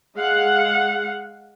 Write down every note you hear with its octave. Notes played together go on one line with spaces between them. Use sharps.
G#3 F5 F#5